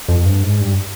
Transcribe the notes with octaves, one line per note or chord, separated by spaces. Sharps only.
F2
G2
G#2
G2